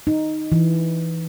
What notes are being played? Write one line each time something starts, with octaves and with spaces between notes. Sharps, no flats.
D#4
E3